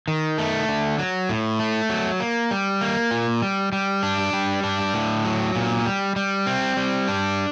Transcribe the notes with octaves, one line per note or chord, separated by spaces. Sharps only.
D#3
A3
D3
F#3
A2
A3
F#3
A#3
G3
A#3
A#2
G3
G3
D4
G3
D4
A2
F#3
A#2
G3
G3
C4
G3
D4